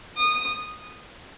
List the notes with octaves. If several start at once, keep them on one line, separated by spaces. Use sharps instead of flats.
D#6